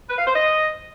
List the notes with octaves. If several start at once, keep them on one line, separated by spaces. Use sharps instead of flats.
B4
F5
C5
D#5